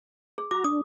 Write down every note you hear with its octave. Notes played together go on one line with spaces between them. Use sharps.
G#4
F#4 A#5 D6
D4 D#6